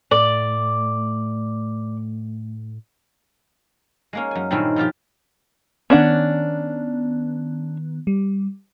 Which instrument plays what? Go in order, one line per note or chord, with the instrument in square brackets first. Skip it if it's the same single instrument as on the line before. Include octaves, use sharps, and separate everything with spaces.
[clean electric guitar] A2 A3 [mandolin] D5
[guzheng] G#3 A#3 C#4
F#2 G#5
G2 A#2 D#3 C4 C#4 E4
B2 F3 F4 G4
[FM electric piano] D#3 B3 [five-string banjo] C#4 D4 F#5
[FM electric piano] G3